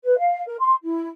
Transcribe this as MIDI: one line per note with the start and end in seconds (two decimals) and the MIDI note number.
0.04 0.16 71
0.18 0.40 77
0.46 0.55 70
0.60 0.74 84
0.83 1.07 64